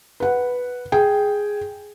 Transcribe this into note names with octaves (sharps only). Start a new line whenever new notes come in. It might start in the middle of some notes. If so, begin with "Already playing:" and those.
B4 F#5
G#4 G5